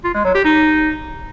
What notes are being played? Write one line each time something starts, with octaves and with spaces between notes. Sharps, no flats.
F4
G#3
F#3
G4
D#4